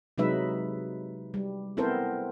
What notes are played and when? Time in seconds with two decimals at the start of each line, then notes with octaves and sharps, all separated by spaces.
0.18 C3 F#3 G#3 D#4 B4 E5
1.34 G3
1.77 B3 C4 E4 A4 A#4 C5